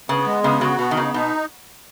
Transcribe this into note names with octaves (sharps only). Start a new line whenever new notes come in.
C#3 B3
G#3
C#3 B3
C#3 F#4
B2 B3
D#3
C#3 D#4
B2 D#4